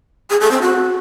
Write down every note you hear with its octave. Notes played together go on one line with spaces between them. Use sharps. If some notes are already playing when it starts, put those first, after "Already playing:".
G#4
A4
C4
F#4